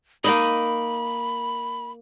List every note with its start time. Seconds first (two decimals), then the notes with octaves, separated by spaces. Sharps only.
0.24 A#3 D#4 D#5 B5